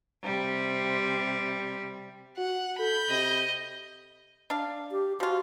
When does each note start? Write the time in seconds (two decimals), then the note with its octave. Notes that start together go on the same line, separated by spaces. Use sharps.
0.23 C3 G3
2.38 F#4 F#5
2.79 A4 B5 G6
3.09 C3 D#5
4.50 D4 F5
4.91 G4
5.20 F3 F4 F#4